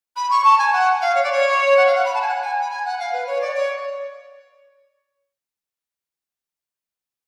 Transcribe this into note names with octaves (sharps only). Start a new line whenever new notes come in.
B5
C#6
A5
G#5
F#5
F5
C#5
D5
C#5
F#5
F5
F#5
B5
A5
G#5
F#5
G#5
B5
G#5
F#5
F5
B4
C#5
D5
C#5